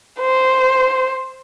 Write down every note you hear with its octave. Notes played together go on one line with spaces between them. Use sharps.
C5